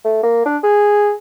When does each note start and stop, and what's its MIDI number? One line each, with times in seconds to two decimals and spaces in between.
0.05 0.21 57
0.23 0.45 58
0.45 0.57 62
0.63 1.12 68